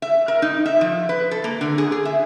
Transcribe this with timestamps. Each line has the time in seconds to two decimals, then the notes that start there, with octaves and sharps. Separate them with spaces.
0.02 E5
0.28 A#4
0.42 D#4
0.66 E5
0.81 F3
1.09 B4
1.31 A4
1.44 A#3
1.61 D3
1.78 G#4
1.92 G#4
2.05 E5